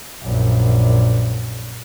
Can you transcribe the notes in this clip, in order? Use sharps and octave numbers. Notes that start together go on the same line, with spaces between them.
A#1 F#2